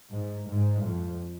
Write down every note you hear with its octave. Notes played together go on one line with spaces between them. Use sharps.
G#2
G#2
F2